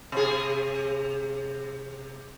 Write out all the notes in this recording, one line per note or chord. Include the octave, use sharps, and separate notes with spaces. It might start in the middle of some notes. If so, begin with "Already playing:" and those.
C3 G#4